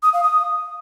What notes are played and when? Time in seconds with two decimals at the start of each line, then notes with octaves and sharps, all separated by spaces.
0.03 D#6
0.13 F5
0.24 D#6